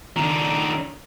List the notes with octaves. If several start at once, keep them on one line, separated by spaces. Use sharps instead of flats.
D#3 D4